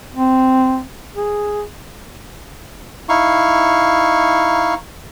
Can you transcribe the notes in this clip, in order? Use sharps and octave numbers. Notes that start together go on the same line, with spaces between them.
C4
G#4
D#4 E4 F5 C#6